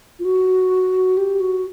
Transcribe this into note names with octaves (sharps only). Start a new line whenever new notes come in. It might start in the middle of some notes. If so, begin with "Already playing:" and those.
F4
F#4
G4
F#4